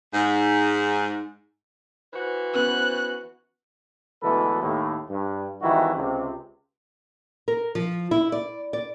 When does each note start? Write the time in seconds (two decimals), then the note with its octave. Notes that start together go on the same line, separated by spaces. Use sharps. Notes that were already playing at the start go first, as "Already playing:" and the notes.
0.14 G#2
2.13 E3 F#4 C5
2.55 B3 C#4 F#6
4.23 D2 B2 E3 G#3 A4 B4
4.62 D#2 A2
5.10 G2
5.62 G#1 D#3 E3 G3 E4 F#4
5.95 C#2 C3
7.48 A#4
7.75 F3
8.11 E4
8.32 D5
8.73 D5